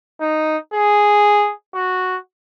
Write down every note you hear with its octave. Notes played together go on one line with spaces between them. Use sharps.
D#4
G#4
F#4